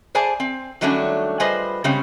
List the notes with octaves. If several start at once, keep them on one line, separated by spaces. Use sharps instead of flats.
G#4 C5 D5 G#5 A5
C4
D#3 F#3 G3 A3 C#4 D4
G3 F4 G#4 B4 C5 D#5
C#3 G3 G#3 C4 C#4